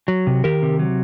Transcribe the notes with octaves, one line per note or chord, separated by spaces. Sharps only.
F#3
C3
D#3 G4 A#4
C3
F#3